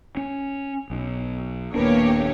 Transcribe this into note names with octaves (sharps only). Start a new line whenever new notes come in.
C#4
B1
D#1 A#3 B3 D4 G4 A#4 B4 C#5